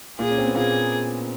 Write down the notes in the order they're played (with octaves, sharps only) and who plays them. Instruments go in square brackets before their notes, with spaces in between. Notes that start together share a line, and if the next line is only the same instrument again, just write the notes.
[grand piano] A#2 A#3 [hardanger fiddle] G#4
[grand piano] C#4
C4
B3
[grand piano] A#2 A#3 [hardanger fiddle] G#4